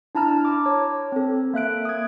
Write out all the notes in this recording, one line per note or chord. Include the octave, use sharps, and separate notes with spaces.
D4 E4 A5 A#5 F6
D6
C#5
C4 A4
A#3 E5 F#6 D7
D#6 G#6